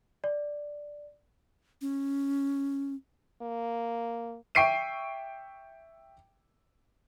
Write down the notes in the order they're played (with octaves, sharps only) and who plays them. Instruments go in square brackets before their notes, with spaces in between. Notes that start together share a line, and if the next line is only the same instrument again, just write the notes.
[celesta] D5
[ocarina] C#4
[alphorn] A#3
[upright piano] E5 G5 C#6 C7 D7 D#7